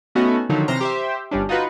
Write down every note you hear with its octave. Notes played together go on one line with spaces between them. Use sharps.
A3 B3 C#4 D#4 F#4
D3 D#3 F3 F#3 D#4
C3 E3 C5 A#5 F6
G4 C5 E5
G1 G3 C#4 D4
D#4 F4 F#4 B4